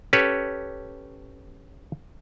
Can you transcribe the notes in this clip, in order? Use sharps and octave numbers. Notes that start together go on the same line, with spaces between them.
C#4 G4 A4 B4 C#5